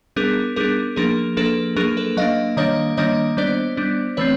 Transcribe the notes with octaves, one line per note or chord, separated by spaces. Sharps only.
G3 B3 D4 G#4 A#4
G3 B3 D4 G#4 A#4
F3 A#3 D4 G#4 A#4
F3 A#3 D4 A4 B4
F#3 A#3 D4 G#4 A#4
A4 B4
F#3 A#3 D4 D#5 F5
D#3 G3 A#3 D4 C#5 D#5
D#3 G3 A#3 D4 C#5 D#5
G3 B3 D4 C5 D5
G3 B3 D4
E3 A3 C4 B4 C#5